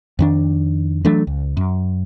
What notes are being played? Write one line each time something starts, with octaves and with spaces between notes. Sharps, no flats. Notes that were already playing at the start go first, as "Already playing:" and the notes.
F2 D#3 D4
E3 F#3 A3 D4
C#2
F#2